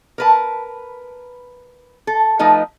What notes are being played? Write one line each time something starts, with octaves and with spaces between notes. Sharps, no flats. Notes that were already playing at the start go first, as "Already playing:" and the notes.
A#4 B4 A5
A4
F3 A3 D#4 B4 D#5